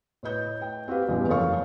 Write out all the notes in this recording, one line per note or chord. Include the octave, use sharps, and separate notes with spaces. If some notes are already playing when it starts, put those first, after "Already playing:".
A2 B4 D#5 G6
G5
C4 F#4 G4 B4 F5
A1 E2 G2 B2 G3
F#1 F2 A4 C#5 F5 C#6